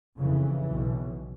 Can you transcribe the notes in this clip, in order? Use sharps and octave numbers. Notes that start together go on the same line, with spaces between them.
F1 F2 C#3 E3
B1 B2